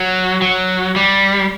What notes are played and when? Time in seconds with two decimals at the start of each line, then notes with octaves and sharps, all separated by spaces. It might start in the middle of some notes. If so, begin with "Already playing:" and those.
Already playing: F#3
0.42 F#3
0.96 G3